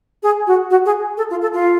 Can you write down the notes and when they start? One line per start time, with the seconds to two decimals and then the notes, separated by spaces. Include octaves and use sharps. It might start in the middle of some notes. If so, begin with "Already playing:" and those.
0.23 G#4
0.47 F#4
0.70 F#4
0.86 G#4
1.17 A4
1.30 F4
1.42 A4
1.54 F4